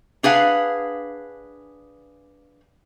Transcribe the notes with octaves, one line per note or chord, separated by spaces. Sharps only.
D4 G#4 B4 F5 F#5